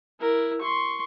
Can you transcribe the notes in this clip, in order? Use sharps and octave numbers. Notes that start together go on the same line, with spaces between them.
E4 A#4
C6 C#6